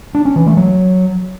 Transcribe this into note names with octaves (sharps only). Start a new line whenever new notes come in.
D4
C#4
E3
A3
F#3